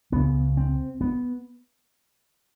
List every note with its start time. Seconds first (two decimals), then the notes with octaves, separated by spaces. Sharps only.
0.12 C#2 C#3 B3
0.57 C4
1.01 B3